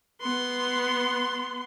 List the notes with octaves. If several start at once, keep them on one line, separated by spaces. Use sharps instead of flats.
B3 C6